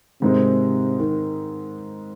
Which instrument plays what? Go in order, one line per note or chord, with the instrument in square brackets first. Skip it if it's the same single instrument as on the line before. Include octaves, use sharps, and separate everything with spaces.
[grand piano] G#2 D#3 G#3 C4 D#4 [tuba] C3
[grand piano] D#3